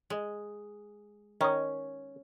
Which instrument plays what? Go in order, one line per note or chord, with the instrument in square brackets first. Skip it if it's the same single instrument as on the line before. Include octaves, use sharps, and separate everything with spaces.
[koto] G#3
[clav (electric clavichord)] D#3 D#5 [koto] C#4